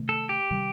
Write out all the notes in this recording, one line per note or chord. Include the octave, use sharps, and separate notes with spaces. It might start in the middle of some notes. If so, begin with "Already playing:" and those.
Already playing: C3 D#3 A3
A4
G4
C3 D#3 G3